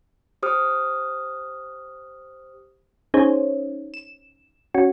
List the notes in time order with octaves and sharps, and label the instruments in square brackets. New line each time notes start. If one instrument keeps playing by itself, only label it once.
[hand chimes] G4 C5 D#6 F6
[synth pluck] C#4 D#4 G#4 C5 C#5
E7
C#4 F#4